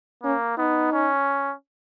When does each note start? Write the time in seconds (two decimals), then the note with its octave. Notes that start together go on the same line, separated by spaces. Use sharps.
0.24 A#3 C#4
0.58 B3 D#4
0.92 C#4